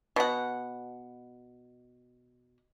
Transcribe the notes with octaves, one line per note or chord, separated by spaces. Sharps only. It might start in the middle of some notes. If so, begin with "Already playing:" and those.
B2 F#5